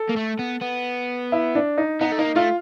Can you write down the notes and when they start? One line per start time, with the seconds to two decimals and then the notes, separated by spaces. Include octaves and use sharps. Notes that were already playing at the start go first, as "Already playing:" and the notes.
Already playing: A4
0.09 A#3
0.16 A3
0.39 B3
0.62 B3
1.32 E4
1.55 D4
1.78 D#4
2.01 B3 D#4
2.12 A3
2.19 A#3 D#4
2.36 A3 F4